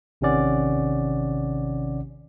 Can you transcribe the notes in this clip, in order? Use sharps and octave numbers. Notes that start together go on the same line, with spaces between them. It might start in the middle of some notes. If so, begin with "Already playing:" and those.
A1 C3 D#3 C#4 D5 F#5